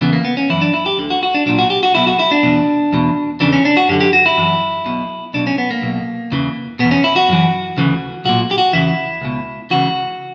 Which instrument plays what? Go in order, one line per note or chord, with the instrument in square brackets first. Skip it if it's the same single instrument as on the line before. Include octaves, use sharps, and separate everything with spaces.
[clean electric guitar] E2 C#3 E3 B3
A#3
B3
C#4
F#2 E3 E4
D4
E4
G4
D2 D3
F#4
F#4
D4
B1 A#2 D4
F#4
G4
F#4
B1 B2 E4
F#4
E4
D4
E2 B2
E2 B2
E2 C#3 E3 D4
C#4
D4
F#4
F#2 D3 G4
G4
F#4
E4
F#2 E3
B1 B2
B1 B2 D4
C#4
B3
A#3
B1 B2
E2 C#3 E3
E2 B2 B3
C#4
E4
F#4
F#2 E3
D2 C#3 E3
B1 A#2 F#4
G4
F#4
E2 C#3 E3 E4
C#2 B2
C#2 C#3 E3 F#4